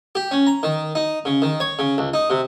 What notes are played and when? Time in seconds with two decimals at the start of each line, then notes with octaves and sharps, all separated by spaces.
0.15 G4
0.31 C#4
0.47 A#5
0.63 D#3
0.95 D#4
1.25 C#3
1.42 D#3
1.60 C#5
1.79 C#3
1.98 C#2
2.14 D#4
2.30 C3